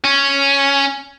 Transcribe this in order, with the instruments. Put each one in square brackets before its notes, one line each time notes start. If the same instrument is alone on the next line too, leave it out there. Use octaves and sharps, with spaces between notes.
[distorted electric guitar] C#4